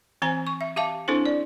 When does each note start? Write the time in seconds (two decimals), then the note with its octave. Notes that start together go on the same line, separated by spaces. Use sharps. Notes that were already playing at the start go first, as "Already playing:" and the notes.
0.22 E3 C4 C5 G#5 A#5
0.47 C#6
0.61 E5
0.76 G4 E5 F5 A5 D6
1.08 C4 D4 E4 A4 C5
1.26 D5